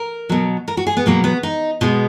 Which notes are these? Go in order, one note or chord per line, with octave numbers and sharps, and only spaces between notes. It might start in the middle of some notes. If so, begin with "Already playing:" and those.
Already playing: A#4
B2 F#3
A#4
F#4
G#4
B3
B2 F#3 A#3
B3
D#4
B2 G#3 B3